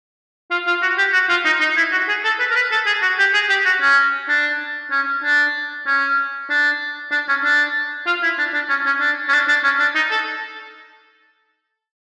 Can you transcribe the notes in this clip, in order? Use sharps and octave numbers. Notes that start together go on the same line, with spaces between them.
F4
F4
F#4
G4
F#4
F4
D#4
D#4
E4
F#4
G#4
A4
B4
A#4
B4
A4
G#4
F#4
G4
G#4
G4
F#4
C#4
D4
C#4
D4
C#4
D4
D4
C#4
D4
F4
E4
D4
D4
C#4
C#4
D4
C#4
D4
D4
C#4
D4
D#4
A4